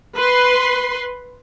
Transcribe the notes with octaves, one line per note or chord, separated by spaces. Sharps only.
B4 C6